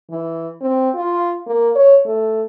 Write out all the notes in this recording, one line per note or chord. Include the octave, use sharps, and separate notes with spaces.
E3
C4
F4
A#3
C#5
A3